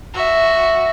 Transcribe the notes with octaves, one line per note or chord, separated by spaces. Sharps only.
F#4 E5